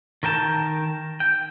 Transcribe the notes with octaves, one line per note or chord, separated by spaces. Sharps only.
D#3 A#4 G5 A5
G5